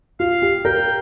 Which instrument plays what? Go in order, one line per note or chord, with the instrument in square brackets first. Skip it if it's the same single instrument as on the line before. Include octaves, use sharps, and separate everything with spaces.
[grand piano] F4 [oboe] F5
[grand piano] G4
[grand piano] A#4 [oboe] G5